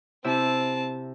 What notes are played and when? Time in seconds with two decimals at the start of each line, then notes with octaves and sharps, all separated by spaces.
0.24 C3 C4 E4 A5 E6